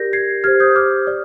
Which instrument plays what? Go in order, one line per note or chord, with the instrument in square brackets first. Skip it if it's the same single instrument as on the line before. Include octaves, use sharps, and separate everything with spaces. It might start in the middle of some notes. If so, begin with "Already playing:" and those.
Already playing: [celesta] G4 A#4 D5 G6 A#6
G#6 C7
G4 C5 F6 G#6
D#6 G6
D6 F6
D5